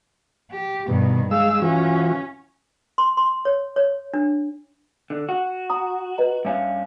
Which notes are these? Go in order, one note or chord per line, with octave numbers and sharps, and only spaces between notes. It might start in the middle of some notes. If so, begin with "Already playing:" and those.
G4
G2 B2 D#3
G#3 F5 E6
E3 C#4 F4 F#4
C6
C6
C#5
C#5
D4
D3
F#4
F#5 A#5 D#6
B4 D#5 A#5
G2 C#4 E5 F5